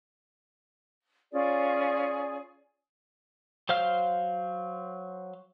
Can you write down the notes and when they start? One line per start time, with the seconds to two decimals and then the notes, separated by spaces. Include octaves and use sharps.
1.31 C#4 F4 G#4 D5
3.69 F#3 C5 F5 F6